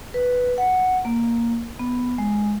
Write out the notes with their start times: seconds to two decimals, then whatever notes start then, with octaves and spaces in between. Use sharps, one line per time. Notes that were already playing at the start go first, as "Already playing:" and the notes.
0.14 B4
0.58 F#5
1.05 A#3
1.79 B3
2.18 G#3